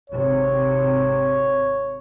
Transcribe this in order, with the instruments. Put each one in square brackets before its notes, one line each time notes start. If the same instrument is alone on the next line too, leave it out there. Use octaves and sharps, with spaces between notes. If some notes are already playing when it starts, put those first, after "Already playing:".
[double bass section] G#1 C3 [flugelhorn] C#5